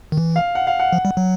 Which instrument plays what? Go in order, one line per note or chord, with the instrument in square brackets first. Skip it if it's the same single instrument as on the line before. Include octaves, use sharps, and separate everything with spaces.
[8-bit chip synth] D#3
E3
[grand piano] F5
F#5
F5
F#5
[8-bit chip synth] F3
G3
F#3